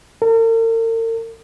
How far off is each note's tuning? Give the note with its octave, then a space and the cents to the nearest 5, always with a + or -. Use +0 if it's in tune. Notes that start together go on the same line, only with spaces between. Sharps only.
A#4 -45